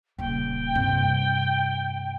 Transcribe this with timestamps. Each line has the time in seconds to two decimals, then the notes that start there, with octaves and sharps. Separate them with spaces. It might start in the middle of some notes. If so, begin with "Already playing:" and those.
0.18 D#1 C#3 G5
0.75 G2 C3